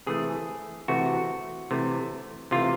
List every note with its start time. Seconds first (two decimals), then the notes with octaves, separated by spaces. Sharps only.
0.06 C3 E3 A3 G#4
0.88 C3 E3 A3 F#4
1.71 C3 E3 A3
2.51 C3 E3 A3 F4